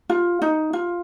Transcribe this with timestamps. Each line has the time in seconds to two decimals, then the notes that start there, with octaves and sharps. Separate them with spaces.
0.10 F4
0.42 D#4
0.73 F4